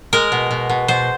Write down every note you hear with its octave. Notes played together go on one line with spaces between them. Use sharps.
G#3 A#4
B2
B2
B2
B2 C5